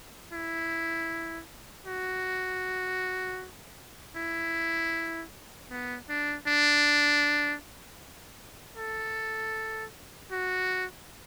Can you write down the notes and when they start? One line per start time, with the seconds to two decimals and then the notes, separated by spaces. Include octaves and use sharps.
0.33 E4
1.87 F#4
4.16 E4
5.71 B3
6.10 D4
6.48 D4
8.78 A4
10.32 F#4